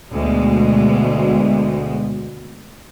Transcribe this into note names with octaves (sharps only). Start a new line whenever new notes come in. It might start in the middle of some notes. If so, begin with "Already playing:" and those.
D2 B2 G#3